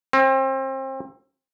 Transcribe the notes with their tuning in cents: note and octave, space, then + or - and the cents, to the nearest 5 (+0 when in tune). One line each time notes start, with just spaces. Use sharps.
C4 +30